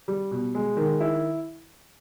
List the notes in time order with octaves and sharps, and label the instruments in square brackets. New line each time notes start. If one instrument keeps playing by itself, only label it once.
[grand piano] G3
B2
G#3
D#3
E4